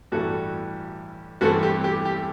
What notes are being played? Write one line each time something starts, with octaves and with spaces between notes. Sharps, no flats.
A1 G2 E3 G3 F#4 A4
G2 E3 A3 C4 F#4 A4
G4
G4
G4